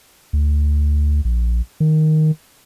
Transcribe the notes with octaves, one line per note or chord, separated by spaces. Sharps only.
D2
A#1
D#3